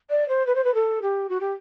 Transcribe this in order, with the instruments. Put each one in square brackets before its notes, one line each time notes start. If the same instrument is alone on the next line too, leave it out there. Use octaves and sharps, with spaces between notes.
[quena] D5
C5
B4
C5
B4
A4
G4
F#4
G4